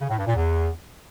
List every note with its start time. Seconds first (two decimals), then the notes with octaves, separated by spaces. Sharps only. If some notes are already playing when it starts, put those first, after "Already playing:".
0.01 C#3
0.10 A2
0.19 G2
0.27 A#2
0.36 E2